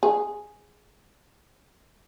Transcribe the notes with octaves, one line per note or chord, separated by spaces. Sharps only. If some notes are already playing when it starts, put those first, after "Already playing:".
G#4